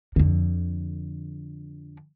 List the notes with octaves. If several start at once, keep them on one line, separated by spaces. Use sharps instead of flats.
F2 D3